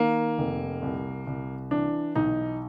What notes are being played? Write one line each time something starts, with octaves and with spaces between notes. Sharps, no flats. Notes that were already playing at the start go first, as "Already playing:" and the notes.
Already playing: D#3 A#3
F1
C2
C2
E3 D4
B1 D#4